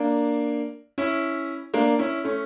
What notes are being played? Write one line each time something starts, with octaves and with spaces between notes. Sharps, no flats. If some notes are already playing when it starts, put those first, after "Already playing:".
Already playing: A#3 D4
C#4 E4
A#3 D4
C#4 E4
A3 C#4